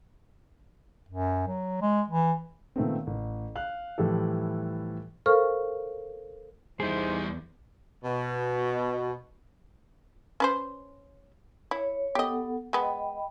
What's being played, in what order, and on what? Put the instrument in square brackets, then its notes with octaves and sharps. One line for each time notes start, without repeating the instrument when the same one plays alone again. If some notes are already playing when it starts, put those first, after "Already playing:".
[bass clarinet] F#2
F#3
G#3
E3
[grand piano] A#2 D#3 A3 B3 C4
A1
F5 F#6
A2 E3 F3 G3 G4 A4
[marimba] A4 A#4 C5 F5 C#6 F6
[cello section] E2 E3 [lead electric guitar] G3 E4 [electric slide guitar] D#4 G#4 [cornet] C5
[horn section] B2
[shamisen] C#4 B4 C5
[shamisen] E4 [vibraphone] C#5
[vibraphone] B3 A4 F#5 [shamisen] G4 D#5
[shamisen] G#3 B3 [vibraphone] D#5 G5 B5